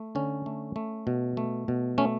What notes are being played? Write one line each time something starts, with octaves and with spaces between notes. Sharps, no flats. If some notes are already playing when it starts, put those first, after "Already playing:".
Already playing: A3
D3 C#4
A3
A3
B2
A3
B2
A3 C#4